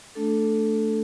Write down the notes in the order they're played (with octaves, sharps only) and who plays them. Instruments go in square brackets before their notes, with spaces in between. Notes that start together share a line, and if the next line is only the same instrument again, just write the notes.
[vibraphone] A3 D4 A4